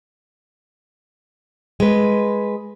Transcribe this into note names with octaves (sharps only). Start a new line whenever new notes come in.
G#3 B4